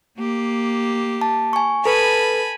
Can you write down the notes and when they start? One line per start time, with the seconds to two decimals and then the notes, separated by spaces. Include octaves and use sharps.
0.17 A#3 G4
1.21 A5
1.53 G#5 C#6
1.85 A4 B4 G#5 A5 B5